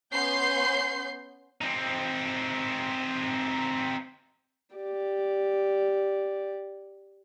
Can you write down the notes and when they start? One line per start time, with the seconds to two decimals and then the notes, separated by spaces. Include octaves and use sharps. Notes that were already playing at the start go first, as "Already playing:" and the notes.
0.13 B3 C#4 C6 G6 C7
1.61 C4 D#4
4.76 G4 D5